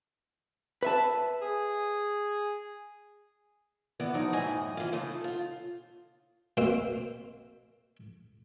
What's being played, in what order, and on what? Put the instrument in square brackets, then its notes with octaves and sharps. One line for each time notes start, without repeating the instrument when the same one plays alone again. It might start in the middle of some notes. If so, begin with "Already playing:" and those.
[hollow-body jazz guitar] B4 E5 A5
[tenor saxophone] G#4
[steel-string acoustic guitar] E3 B3 D5
F3 F#3 D#4
F#2 A2 E3 D#5 G#5
E3 F4
C#3 D#4 A4
F4
[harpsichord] B2 A#3 C4 C5 E5